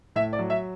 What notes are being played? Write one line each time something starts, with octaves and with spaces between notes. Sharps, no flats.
A2 E5
D5
F#3
E5